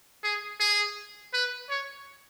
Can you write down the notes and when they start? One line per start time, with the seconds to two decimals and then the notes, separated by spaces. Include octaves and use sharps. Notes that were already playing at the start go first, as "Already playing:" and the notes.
0.24 G#4
0.60 G#4
1.34 B4
1.70 C#5